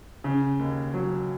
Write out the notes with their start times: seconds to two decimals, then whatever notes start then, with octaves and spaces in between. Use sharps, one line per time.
0.24 C#3
0.59 D#2
0.94 F#3